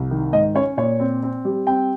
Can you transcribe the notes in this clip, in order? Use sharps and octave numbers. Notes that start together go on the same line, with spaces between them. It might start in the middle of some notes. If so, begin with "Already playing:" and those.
Already playing: C2
D#3
G#2 D#5
C#4 C#5
A#2 C#5
C4
C4
G3
C4 G5